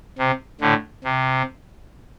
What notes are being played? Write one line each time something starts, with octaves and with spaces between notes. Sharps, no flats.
C3
A2 D3
C3